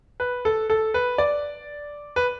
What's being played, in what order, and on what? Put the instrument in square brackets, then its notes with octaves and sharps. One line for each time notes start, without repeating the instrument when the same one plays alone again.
[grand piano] B4
A4
A4
B4
D5
B4